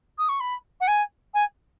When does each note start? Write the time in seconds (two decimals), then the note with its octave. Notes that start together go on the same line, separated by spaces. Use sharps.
0.18 D#6
0.29 C#6
0.40 B5
0.81 F#5
0.88 G#5
1.34 G#5